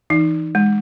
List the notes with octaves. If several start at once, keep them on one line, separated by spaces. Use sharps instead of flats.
E3 D#4
G#3